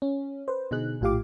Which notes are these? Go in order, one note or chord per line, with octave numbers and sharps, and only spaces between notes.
C#4
B4 C5
B2 D3 D#4 G#4 F#6
A#1 A2 F4 G4 F5 D6